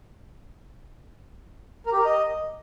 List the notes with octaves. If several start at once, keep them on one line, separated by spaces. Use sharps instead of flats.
A#4
G4
A#4
D#5